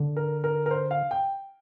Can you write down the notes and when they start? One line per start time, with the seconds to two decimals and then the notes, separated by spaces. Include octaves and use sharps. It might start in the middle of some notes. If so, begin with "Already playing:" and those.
Already playing: D3
0.17 A#4
0.44 A#4
0.66 A#4
0.71 C5
0.91 F5
1.11 G5